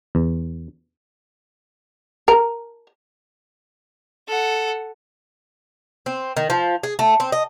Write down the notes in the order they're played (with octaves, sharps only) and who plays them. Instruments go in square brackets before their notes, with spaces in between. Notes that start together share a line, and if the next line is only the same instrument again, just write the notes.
[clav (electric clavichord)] E2
[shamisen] A#4
[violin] A4 F#5
[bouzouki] C4
D#3
F3
G#4
A3
C4
D#5